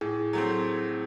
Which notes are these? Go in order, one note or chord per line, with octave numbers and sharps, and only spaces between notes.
A2 G#4
F#3 A3 C4